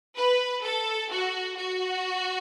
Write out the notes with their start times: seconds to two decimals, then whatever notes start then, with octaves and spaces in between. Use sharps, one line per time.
0.17 B4
0.64 A4
1.11 F#4
1.57 F#4